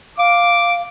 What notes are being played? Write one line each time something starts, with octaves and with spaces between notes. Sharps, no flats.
F5 D6